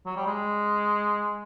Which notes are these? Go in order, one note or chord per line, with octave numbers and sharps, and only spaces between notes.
F#3
G3
G#3